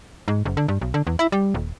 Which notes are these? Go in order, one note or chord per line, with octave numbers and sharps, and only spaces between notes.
G#2
F#1
D3
G2
B1
D3
E2
E4
G3
D#1